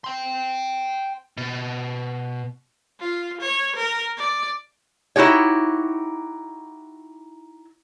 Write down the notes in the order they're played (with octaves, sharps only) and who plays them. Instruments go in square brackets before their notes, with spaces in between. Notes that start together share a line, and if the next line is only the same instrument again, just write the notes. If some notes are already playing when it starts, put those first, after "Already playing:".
[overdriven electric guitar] G5 C6
B2
[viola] F4
C#5
A#4
D5
[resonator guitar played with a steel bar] D#4 E4 F#4 G4 C#5